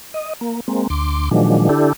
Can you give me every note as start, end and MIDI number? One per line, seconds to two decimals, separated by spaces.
0.14 0.33 75
0.41 0.60 58
0.68 0.87 56
0.68 0.87 58
0.68 0.87 60
0.90 1.29 38
0.90 1.29 84
0.90 1.29 86
1.31 1.69 46
1.31 1.69 51
1.31 1.69 53
1.31 1.69 54
1.31 1.69 56
1.31 1.69 62
1.69 1.93 50
1.69 1.93 62
1.69 1.93 64
1.69 1.93 67
1.69 1.93 69